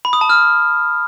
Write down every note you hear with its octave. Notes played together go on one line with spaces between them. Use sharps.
B5
D#6
A5
F6